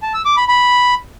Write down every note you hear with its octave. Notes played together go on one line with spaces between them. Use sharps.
A5
E6
D6
B5
B5